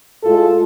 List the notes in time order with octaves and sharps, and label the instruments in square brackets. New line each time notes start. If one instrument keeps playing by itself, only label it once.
[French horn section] A2 G#3 F4 A4